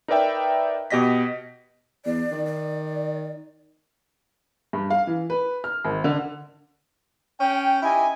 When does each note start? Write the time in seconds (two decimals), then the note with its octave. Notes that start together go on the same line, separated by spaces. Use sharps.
0.08 D#4 A#4 B4 D5 E5 G5
0.90 B2 G4 D#5 A#6 B6
2.05 E2 D5
2.31 D#3
2.46 D5
4.73 G2
4.90 F5
5.07 E3
5.30 B4
5.64 F6
5.84 G#1
6.04 D3
7.40 C#4 G5
7.83 C#4 D#4 E4 G4 D#5 G#5